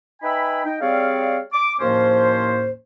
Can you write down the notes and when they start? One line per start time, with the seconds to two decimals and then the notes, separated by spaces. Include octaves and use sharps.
0.22 D#4 B4 E5 G5 G#5 B5
0.64 D#4 G5
0.81 G3 C4 G#4 C#5 D5 F5
1.53 D6
1.80 D#2 A2 F3 A#3 C#4 C5